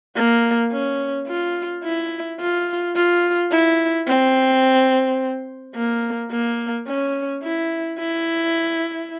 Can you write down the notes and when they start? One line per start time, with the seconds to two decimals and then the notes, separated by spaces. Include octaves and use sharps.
0.16 A#3
0.72 C#4
1.28 F4
1.84 E4
2.40 F4
2.96 F4
3.51 E4
4.07 C4
5.75 A#3
6.31 A#3
6.87 C#4
7.43 E4
7.99 E4